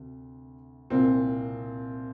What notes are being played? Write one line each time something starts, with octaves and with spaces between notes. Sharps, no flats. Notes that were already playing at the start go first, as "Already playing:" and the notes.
Already playing: D2 C3
C2 A#2 C4